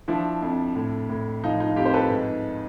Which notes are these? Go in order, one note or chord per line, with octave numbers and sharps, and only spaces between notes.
F3 D4 E4
F2
A2
A2
F3 D#4 F4
D#4 F4
F2 F4 G4
C5
A4 B4
G#2